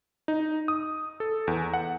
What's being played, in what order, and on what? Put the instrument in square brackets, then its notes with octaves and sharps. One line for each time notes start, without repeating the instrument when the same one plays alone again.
[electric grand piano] D#4
D#6
A4
E2
F#5